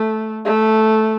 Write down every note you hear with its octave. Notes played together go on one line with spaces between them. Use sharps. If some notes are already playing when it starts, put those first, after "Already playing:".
Already playing: A3
A3